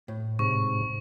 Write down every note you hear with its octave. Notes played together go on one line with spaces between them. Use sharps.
A2
G#2 C3 C#6